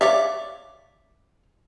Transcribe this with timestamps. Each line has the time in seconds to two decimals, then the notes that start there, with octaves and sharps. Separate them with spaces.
0.01 C#5 D5 E5 F5 D6